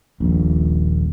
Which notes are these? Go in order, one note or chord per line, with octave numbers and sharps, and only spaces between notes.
D#1 A#1